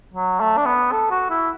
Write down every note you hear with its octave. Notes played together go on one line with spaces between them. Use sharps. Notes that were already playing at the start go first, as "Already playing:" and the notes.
F#3
A3
D4
B3
A4
F#4
E4